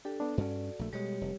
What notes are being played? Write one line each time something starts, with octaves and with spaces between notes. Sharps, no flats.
D4 G4 A4
B3 D4
G2 C#4 F#4 A4 D5
A#1 A3
B2 G3 G#3 G4 C#5
F1